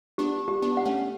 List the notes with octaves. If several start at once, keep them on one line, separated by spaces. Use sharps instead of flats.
B3 D4 G4
G4
B3 D4
F#5
A3 C#4